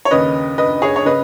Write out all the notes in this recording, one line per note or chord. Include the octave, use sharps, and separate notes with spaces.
C#5
D#2 C#3 B4 D#5
B4 D#5
G#4 C#5
C#5
C#3 B4 D#5